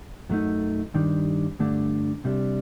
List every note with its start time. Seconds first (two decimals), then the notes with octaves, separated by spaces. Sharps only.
0.30 F#2 F#3 A3 D#4
0.94 G2 D#3 G3 D4
1.59 G2 D3 A3 D4
2.24 C2 C3 G3 D4